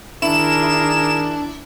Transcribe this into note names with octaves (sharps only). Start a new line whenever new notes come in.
D#3 D4 E4 G#4 A#4 E7